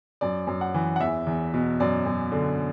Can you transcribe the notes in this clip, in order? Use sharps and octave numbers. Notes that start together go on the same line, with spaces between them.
F#2 D5
F#2
F#5
E3
F#5
E2 E5
E2
B2
F#2 D5
F#2
D3